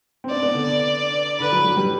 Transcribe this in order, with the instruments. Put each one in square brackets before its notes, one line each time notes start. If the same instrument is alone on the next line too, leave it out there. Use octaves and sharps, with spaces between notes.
[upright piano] C4
[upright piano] D4 [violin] D5
[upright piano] B3
D3
[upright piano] D3 [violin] B4
[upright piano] F#3
F#3
G3